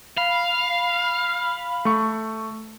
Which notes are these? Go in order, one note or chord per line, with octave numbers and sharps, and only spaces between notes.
F5 B5
A3 C#6